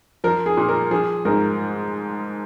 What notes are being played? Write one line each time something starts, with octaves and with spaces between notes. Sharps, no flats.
F3 A#4
G#4
A#2
A#4
F3 G#4
G#2 A#4